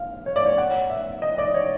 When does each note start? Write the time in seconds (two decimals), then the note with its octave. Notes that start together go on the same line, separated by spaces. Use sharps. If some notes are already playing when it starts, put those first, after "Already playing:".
Already playing: F5
0.26 C#5
0.36 D5
0.46 C#5
0.58 F#5
0.90 E5
1.22 D#5
1.38 D5
1.54 C#5